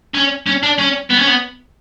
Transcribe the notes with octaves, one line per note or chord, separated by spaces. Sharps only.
C#4
C#4
D4
C#4
B3
C#4
B3